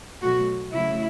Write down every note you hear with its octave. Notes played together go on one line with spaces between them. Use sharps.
B2 F#3 A3 F#4
C#3 F#3 A3 E4